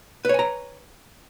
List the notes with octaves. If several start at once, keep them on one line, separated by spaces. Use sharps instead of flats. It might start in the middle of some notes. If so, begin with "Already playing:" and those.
B4 C#5 G#5 A#5